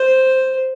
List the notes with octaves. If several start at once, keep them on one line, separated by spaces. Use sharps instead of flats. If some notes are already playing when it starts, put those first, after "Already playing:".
Already playing: C5